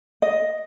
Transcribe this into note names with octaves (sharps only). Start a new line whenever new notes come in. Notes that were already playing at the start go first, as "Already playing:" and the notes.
D#5